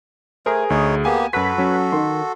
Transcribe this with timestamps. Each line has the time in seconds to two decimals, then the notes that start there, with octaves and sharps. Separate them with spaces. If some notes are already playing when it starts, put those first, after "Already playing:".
0.46 A3 G#4 A#4 C5
0.70 D2 D#4 C#5
1.05 A#3 B3 G4 G#5
1.33 F#2 F#4 A4 B4 B6
1.58 F#3 C#4
1.92 D#3 C6